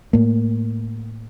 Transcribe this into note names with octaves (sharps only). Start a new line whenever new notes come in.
A2 A#3